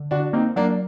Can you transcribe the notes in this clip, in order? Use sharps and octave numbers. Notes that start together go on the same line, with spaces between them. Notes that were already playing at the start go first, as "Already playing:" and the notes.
Already playing: D3
D3 D4 F#4
A#3 C4 D#4
F#3 A#3 D4